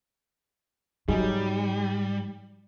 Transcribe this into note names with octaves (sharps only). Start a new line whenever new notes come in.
G#2 F#3 G3 D#4 G#4